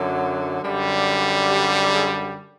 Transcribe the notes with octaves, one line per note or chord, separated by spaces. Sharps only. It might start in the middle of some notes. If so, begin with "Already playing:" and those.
Already playing: F#2 D3 F#3
F#2 D3 G3
G4
G#4